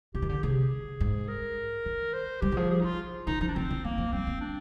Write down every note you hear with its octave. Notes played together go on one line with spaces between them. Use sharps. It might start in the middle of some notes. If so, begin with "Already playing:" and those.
C3 G4
D#3
D3 G4
C3 G#4
G#2
A#4
D#3
C5
G3 G4
D#3
F3 G#4
G#4
D#4
F4
D#3 D#4
F3 D#4
D4
D3 C4
D3
F3 A#3
F3
G3 C4
A#3
D4